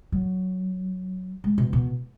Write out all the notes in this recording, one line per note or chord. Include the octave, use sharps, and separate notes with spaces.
F#3
G#3
B2
B2